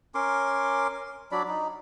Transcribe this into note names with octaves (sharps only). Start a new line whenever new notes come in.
C#4 A#4 C6 D6
F#3 D4 D5 B5
D#4